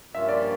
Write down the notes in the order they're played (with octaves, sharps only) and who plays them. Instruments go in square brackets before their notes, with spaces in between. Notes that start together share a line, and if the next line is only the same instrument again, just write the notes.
[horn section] G2 F3 A#3 C#4 F4 [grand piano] E5
[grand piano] D5